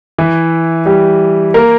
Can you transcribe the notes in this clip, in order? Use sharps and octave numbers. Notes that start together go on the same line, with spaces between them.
E3 E4
G3 G4
A#3 A#4